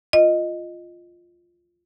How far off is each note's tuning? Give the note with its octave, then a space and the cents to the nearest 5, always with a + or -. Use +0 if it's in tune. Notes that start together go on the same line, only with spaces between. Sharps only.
F4 +0 D#5 -5